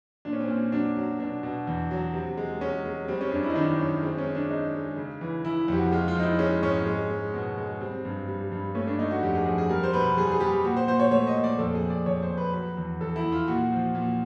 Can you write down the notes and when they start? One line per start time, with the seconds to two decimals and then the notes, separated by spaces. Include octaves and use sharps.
0.25 A#2 D4
0.33 C#4
0.40 C4
0.47 A#2 C#4
0.72 F#3 D4
0.96 F#3
1.19 B2 D4
1.43 B2
1.67 E2
1.91 F#3
2.14 C3
2.37 G#3
2.61 G#3 C#4
2.85 G#3
3.08 G3 C4
3.21 C#4
3.32 F#2 D4
3.43 E4
3.50 D#4
3.55 D#3 D4
3.79 F#2 C#4
4.03 G#3 C4
4.18 C#4
4.26 G#3
4.35 D4
4.50 G#3 D#4
4.74 G#3
4.97 C#3
5.21 E3
5.44 E3 E4
5.68 F2 G4
5.77 F#4
5.92 G#3 F4
6.08 F4
6.15 F3 D#4
6.23 E4
6.39 G#3 C#4
6.63 G#2 C#4
6.86 G#3
7.10 G#3
7.34 B2
7.57 G#3
7.81 G3 C4
8.05 G2
8.28 G3
8.52 G2
8.75 A3 C#4
8.87 D4
8.99 A3 D#4
9.11 F#4
9.22 F2 G4
9.35 G#4
9.46 F2 G#4
9.58 G#4
9.70 G3 A#4
9.83 C5
9.93 B2 B4
10.17 G3 G#4
10.32 G#4
10.40 G3 G4
10.64 A#2 F#4
10.77 C5
10.88 A#2 C5
11.00 C#5
11.11 A3 C#5
11.27 D#5
11.35 A#2
11.44 D5
11.59 F2 A4
11.75 G#4
11.82 F2
11.90 D5
12.06 F2 C#5
12.22 C5
12.30 F2
12.38 B4
12.54 F#3 B4
12.77 E2
13.01 E2 A4
13.16 E4
13.24 E2
13.32 F4
13.48 A#2 F#4
13.72 F3
13.95 A#2